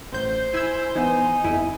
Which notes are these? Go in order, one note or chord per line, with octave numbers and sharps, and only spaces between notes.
A1 C5 G6
E4 G#5 E6
E3 B3 D#4 G#5
G1 F2 E4